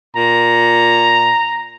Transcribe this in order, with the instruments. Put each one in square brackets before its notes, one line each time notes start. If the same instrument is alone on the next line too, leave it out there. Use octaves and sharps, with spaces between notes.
[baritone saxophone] A#2 [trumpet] A#5